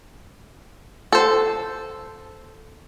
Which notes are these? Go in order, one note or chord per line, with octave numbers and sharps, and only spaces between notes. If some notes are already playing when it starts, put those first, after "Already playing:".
A4 C5